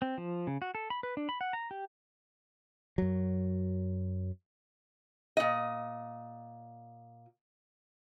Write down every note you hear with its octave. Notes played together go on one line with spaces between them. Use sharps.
C4
F3
C#3
F#4
A4
B5
B4
D4
B5
F#5
A#5
G4
F#2 F#3
A#2 D#5